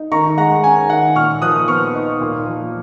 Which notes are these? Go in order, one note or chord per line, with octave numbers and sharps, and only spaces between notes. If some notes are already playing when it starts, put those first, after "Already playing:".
Already playing: D#4
D#3 A#5 C#6
G#3 F#5 A#5
C#4 G#5
D#3 F#5
A#2 C#6 F6
F3 D#6 F#6
B3 C#6 F6
D#4
A#2
F3